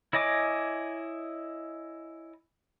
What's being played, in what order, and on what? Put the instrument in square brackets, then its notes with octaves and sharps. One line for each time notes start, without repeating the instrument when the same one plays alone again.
[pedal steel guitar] E4 C#5 D#5 G#5 D6